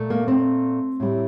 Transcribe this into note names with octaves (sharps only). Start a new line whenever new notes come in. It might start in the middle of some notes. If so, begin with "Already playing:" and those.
Already playing: A#2 A3
A#3
C4
A2 G3